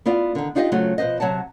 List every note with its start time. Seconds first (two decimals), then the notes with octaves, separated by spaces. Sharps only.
0.06 B3 E4 F4 D5
0.35 D3 D#3
0.55 D4 D#4 F4 G4 C5 D#5
0.72 C#3 F#3 A3 C4 F4 F#4
0.98 B2 F3 B4 C5 D#5
1.20 C3 F#3 C#5 F#5 A5